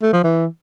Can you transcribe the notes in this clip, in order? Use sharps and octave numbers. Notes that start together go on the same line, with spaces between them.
A3
F3
E3